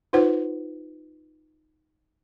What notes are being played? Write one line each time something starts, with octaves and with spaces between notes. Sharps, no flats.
D#4 F4 B4 C5 F#5